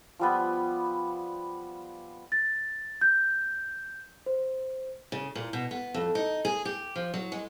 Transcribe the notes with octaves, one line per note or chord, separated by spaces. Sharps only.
F3 G3 B3
A6
G6
C5
C#3
A#2
B2
B3
F2
D#4
G#4
G4
F3
F#3
G#3